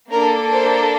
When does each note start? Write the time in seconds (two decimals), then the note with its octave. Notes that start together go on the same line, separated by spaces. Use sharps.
0.11 A#3 D4 A4 A#4
0.51 C5